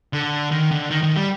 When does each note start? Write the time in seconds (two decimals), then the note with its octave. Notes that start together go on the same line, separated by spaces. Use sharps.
0.13 D3
0.52 D#3
0.71 D3
0.91 D#3
1.03 D#3
1.16 G3